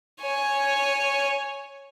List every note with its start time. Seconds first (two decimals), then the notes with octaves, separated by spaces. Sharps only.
0.22 C#5 G#5